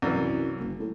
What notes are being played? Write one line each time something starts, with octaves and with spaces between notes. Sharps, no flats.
C2 F#2 E3
F#1
A2